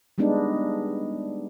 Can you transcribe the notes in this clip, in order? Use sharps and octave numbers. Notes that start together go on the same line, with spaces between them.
G3 G#3 B3 D4 D#4